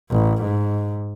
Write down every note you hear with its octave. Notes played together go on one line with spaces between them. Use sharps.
A1
G#2